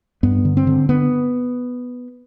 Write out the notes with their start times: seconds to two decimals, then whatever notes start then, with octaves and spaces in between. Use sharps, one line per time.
0.23 G2 B3
0.45 D3
0.57 C4
0.67 D3
0.89 D3 B3